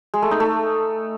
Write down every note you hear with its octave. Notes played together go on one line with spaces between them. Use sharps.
G#3
A3
D#4
A3